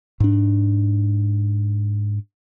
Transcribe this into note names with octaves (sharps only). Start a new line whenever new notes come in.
G#2 D4